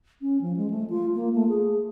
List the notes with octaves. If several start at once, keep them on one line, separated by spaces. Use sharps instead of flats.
C#4
F3
G#3
A3
F4
A#3
A3
G#4